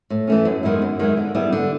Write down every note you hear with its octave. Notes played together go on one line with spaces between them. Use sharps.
A2
E3 A3 C#4
F#2
D#3 G#3 B3 E4
F#2
D#3 G#3 B3 E4
D3
G3 B3 E4 G#4
D3